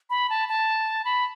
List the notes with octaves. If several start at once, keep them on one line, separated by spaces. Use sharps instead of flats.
B5
A5
A5
B5